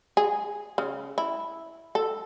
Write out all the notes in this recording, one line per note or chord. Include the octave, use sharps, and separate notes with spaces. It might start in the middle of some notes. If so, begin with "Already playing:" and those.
G#4
C#3
E4
A4